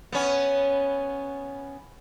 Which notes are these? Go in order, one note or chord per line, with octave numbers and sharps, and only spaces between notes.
B3 C#4